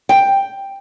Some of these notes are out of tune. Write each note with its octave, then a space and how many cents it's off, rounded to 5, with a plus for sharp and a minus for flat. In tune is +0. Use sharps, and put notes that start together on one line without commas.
G5 +5